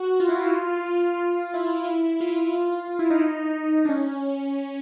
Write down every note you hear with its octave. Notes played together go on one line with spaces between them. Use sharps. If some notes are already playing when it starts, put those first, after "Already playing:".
Already playing: F#4
F4
E4
F4
F4
E4
F4
F4
E4
D#4
D4
C#4